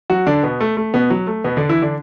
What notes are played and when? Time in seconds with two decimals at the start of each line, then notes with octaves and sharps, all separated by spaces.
0.10 F#3 F#4
0.27 D3 D4
0.43 B2 B3
0.60 A3
0.77 A3
0.94 B2 B3
1.10 F#3
1.27 A3
1.44 B2 B3
1.57 D3 D4
1.69 E3 E4
1.82 D3 D4